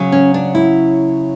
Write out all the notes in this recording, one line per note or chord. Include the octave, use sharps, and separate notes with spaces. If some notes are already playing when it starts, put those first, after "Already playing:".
Already playing: C#3 F#3
C#4
D4
E4